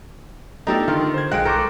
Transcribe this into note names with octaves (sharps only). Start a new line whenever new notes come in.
A3 B3 D4 D#4 F4 G4 A4
D3 D#3 F4 A#4
C5 G#6
B1 G#3 F5 G5 F#6 D7
A4 A#4 C5 C#6 D6